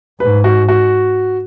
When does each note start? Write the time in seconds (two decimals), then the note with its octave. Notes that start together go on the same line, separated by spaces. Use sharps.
0.20 G#2 B4
0.44 F#4
0.69 F#4